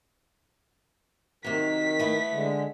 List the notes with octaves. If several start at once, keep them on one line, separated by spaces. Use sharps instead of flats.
C3 D#3 F#3 B6
A3 B3 E4
D3 G#3